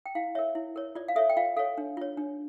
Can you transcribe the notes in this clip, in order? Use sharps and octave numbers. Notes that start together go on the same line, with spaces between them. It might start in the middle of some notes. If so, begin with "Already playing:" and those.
G5
E4 F5
A#4 C#5 E5
E4
A#4 C#5
F4 D5
F5
A4 C#5 E5
G5
F4 F5
A4 C#5 F5
D4
F4 C#5
D4